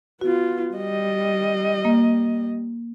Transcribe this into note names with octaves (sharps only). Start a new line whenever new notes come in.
B3 F4 F#4
G3 D#5
A#3